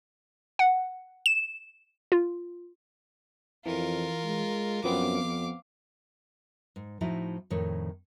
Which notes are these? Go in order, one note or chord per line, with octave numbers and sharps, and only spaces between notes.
F#5
E7
F4
F2 E3 F4 A#4
G#3
F#2 F3 B3 C4 F5 D6
F2
G#2
A2 F3 D#4 E4 F#4 E5
F2 A2 D#3 C#5